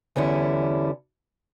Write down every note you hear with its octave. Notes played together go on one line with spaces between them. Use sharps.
E2 D3 G3 C#4 E4